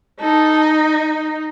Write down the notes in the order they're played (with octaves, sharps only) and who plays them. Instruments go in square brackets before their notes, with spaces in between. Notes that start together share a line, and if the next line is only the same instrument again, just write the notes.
[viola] D#4 [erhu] A4